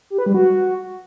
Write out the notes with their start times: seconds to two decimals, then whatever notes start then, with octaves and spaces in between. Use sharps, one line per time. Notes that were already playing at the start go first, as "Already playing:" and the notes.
0.10 G4
0.18 B4
0.26 G3
0.34 F#4